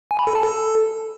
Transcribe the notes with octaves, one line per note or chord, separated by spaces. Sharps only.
G#5
B5
A4
A5
A4